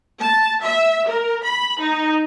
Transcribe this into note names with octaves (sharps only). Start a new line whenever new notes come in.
A5
E5
A#4
B5
D#4